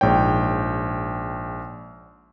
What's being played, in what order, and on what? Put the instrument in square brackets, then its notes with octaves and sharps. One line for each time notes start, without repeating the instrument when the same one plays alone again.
[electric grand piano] A#1 G#2 C#5 G5